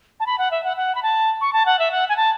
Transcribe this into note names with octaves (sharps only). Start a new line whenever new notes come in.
A5
B5
F#5
E5
F#5
F#5
B5
A5
C#6
A5
F#5
E5
F#5
G#5
A5